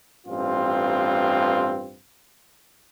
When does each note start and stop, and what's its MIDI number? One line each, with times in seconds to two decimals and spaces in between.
0.27 1.98 33
0.27 1.98 43
0.27 1.98 60
0.27 1.98 65